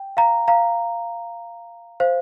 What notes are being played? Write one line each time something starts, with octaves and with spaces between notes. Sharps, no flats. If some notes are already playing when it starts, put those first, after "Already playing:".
Already playing: G5
F5 A#5
F5 A#5
C5 F5